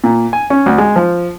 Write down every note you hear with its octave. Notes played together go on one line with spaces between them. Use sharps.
A#2
G#5
C#4
D2
G#3
F3